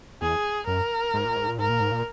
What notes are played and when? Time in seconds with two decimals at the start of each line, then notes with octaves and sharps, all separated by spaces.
0.22 E2 G#4
0.67 F#2 A#4
1.14 G#2
1.25 A#2
1.36 G#2
1.48 A#2
1.59 G#2 A#4
1.69 A#2
1.80 G#2
1.91 A#2